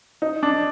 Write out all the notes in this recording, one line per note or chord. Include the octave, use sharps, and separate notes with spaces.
D#4
D4